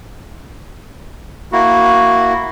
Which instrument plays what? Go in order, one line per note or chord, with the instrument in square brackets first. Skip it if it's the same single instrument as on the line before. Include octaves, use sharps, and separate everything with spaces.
[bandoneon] A#3 E4 F#4